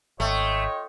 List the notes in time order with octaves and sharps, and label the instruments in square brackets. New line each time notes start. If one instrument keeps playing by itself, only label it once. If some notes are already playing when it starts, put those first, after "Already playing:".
[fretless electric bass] G#1 [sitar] A3 [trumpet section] F4 D#5 G5 [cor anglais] C#5